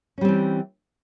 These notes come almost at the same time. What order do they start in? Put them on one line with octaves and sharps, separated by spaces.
C#4 G3 C4 E3